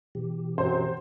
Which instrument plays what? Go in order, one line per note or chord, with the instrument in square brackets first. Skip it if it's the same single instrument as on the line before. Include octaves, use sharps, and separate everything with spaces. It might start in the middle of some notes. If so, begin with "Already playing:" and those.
[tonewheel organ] B2 E3 G4
[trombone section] F#2 F#3 C4 [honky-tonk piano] C5